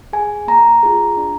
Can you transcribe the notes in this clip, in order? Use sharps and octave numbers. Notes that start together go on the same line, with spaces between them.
G#4 G#5
A#3 A#5
F4 G#4
D4